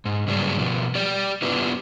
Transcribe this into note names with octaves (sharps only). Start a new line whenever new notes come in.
G#2
G2 C#3 F#3 G3 G#4 D5
B2 F3
G4 D5
B3 D4 E4 F4 G4 B4